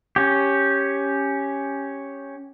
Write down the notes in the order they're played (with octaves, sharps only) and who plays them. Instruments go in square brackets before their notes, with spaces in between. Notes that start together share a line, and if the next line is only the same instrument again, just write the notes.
[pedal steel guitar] C#4 G4